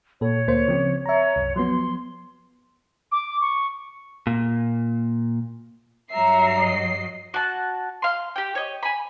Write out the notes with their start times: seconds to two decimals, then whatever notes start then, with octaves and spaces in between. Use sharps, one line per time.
0.21 A#2 A4 C#5
0.47 D2 A#3 C5
0.68 C#3 F3 C4
1.06 C#5 E5 A#5
1.36 C2 F#2
1.56 F3 F#3 B3 C6
3.12 D6
3.41 C#6
4.27 A#2
6.12 G2 F#3 E5 A#5 C7
6.60 D#5
7.34 F#4 A5
8.02 F5 C6
8.36 G4 G5
8.55 C#5 D#5
8.83 G#5 B5